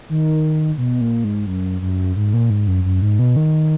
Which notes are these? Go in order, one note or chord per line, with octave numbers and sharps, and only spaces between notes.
D#3
B2
A#2
G#2
F#2
F#2
G#2
A#2
G#2
F#2
F#2
G#2
B2
D#3